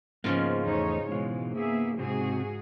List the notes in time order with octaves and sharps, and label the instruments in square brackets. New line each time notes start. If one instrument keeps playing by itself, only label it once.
[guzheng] G#2 C#3 F3 [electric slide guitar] A#3 B3 F4
[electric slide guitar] E2 A3 [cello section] D#4 C#5
[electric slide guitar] B2 E3 F4 [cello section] G#3
[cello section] A#3 G#4 E5 [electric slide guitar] B3
[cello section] G#2 F#4 G#4 [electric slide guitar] C3 C4